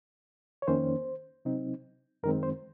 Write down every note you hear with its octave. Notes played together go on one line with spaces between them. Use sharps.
C#5
F2 D#3 A#3 C#4 C5
C3 F#3 C4 D#4
F#2 D#3 G#3 C4 A#4
C5